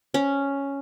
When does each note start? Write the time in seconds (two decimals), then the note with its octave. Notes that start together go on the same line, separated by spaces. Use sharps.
0.14 C#4